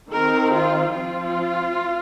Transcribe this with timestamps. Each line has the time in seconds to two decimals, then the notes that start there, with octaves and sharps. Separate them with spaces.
0.11 D#3 C4 A#4
0.52 F4
0.93 F3 C4 F4